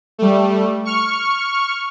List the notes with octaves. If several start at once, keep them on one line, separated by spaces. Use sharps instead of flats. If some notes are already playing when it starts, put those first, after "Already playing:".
G3 A3
C#6 F6